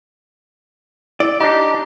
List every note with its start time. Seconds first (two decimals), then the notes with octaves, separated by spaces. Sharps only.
1.20 E4 D5
1.40 D4 D#4 G4